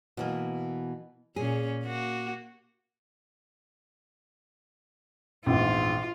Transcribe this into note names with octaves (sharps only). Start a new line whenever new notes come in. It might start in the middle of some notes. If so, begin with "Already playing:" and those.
B2 E3 A#3
A#2 C#4 G#4
A#3 F#4
A#1 E2 G#2 F4